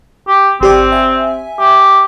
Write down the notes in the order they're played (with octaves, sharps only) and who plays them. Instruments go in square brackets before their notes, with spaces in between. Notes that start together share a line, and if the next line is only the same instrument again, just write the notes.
[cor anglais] G4
[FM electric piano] G#1 G4 D5 [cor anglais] C4
[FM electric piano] E5 G#5
[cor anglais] G4